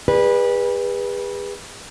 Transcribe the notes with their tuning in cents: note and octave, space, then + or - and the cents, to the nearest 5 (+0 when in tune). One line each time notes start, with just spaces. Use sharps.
G#4 -45 B4 -20 D5 +20